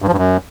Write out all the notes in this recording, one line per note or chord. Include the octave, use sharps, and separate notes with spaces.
G2
F3
G2
F#2